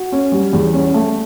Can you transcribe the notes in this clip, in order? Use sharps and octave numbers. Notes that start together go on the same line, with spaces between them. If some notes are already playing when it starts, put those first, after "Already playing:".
Already playing: F#4
C#4
G3
E2
C#4
A3